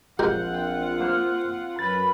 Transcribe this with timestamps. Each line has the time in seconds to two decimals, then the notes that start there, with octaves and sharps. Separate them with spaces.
0.19 A#1 G#3 C4 F4 G4 A#4 F#5 G6
0.54 G5
1.00 A#3 C5 F6
1.79 F#2 C#4 B4 B5 A6